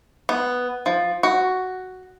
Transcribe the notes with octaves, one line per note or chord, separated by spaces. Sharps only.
B3
F3
F#4